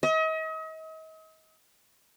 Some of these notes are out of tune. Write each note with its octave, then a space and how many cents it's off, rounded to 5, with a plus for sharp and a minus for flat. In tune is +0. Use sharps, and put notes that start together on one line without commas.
D#5 +40